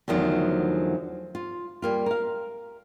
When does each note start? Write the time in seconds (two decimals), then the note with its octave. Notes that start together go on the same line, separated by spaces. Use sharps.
0.08 E2 D3 D#3 F3 F#3 A3
1.35 F4
1.82 G3 A#3 F4
2.06 A#4 F5